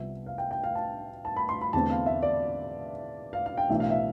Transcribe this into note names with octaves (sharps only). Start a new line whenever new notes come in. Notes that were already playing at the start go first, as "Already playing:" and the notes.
Already playing: C2 C3 F3 B3 E5
F5
G5
G5
F5
A5
A5
B5
C6
B5
E2 D3 A3 C4 A5
F5
E5
D5
F5
F5
G5
B1 A2 E3 A3 D4 E5
F5
E5